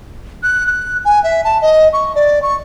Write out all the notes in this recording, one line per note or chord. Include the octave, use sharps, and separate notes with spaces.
F#6
F#6
G#5
E5
A5
D#5
C#6
D5
C#6